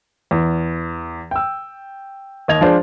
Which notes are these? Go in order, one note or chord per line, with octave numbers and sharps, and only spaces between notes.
E2
G5 E6
D#2 D#5 G#6 F7
F3 G#3 D4 C5